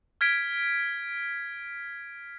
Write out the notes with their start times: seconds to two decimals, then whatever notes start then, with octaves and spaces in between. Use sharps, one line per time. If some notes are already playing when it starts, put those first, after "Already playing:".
0.21 F6 G#6 B6 D7